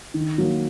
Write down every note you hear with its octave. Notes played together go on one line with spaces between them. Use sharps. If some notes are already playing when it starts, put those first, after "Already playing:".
D#3
F#3 A#3